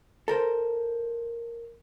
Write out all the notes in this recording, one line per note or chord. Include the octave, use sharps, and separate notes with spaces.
A4 A#4 C5